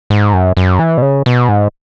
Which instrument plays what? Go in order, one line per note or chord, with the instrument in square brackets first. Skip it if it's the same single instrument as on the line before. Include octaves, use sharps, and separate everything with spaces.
[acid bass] G#2
F#2
F#2
E3
B2
C#3
B2
G#2